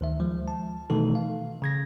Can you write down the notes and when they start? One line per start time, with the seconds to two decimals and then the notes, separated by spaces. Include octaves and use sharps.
0.01 D2 D#3 E5
0.20 F3 G#3
0.48 A5
0.90 B2 D#3 E3 A3 D#4 A4
1.15 F5
1.62 C#3 G#6 A#6